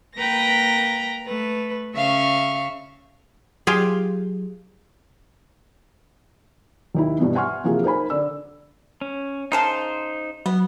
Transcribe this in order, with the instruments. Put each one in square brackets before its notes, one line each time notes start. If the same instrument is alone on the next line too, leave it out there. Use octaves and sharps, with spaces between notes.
[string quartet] A#3 B4 G5 A#5 A#6
A3 B4
C#3 E5 F5 C#6
[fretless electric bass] F#3 [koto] F4 G4 G#4
[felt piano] D#2 D#3 E4
G2 B2 E3 B3
E5 F#5 G#5 C6 C#6 F6
C3 E3 F3 A#3 F4 G#4
D#4 A#4 C5 G#5 B5
D3 D5 E6
[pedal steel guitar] C#4
[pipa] C#3 A#4 A5 [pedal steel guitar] D#4 C5 C6
[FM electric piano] F#3 [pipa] B3